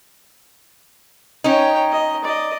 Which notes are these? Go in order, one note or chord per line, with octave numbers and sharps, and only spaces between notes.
C#4 D#4 C#5 G5
D#5
D5 D#5